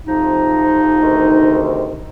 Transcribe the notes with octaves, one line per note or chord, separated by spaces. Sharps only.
F2 C3 F3 D#4
D2 C3 D#3